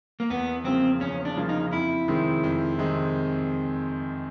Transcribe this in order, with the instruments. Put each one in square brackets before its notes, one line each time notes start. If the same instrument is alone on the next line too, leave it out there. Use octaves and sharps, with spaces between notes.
[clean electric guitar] A#3
[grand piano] E2 [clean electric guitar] B3
[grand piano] C#3 F3 A#3 [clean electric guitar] C4
[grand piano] E2 [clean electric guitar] C#4
[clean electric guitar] D4
[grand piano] C#3 F3 A#3
[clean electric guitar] D#4
[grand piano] F2 [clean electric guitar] E4
[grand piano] C3 D#3 G#3 C4
F2
C3 D#3 G#3 C4